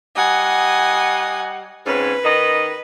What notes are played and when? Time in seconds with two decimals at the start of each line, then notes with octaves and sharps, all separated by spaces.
0.17 G3 D#5 F#5 G#5 D#6
1.86 F2 G#2 C#4 B4
2.24 D#3 D#5